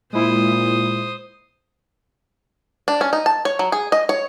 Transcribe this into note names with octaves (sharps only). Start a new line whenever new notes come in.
A#2 G#3 E4 C5 D#6
D4
C#4
D#4
A5
C#5
F#3
G#4
D#5
C#5